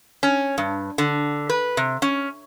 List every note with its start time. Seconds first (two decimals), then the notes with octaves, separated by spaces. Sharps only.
0.23 C#4
0.58 G2
0.98 D3
1.50 B4
1.77 C3
2.02 C#4